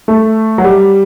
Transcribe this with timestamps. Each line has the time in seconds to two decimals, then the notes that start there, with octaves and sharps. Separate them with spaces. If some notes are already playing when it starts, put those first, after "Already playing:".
0.08 A3
0.58 F#3
0.64 G3